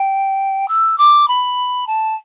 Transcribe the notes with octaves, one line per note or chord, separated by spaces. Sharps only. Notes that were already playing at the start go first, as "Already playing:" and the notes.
Already playing: G5
E6
D6
B5
A5